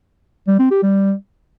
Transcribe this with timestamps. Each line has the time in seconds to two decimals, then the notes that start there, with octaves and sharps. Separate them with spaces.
0.47 G3
0.59 C4
0.71 G4
0.83 G3